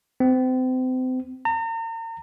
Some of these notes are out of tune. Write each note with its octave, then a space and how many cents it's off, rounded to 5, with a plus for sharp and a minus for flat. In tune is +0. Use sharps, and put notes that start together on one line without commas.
C4 -35
A#5 -40